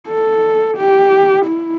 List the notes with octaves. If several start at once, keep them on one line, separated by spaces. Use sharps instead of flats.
A4
G4
E4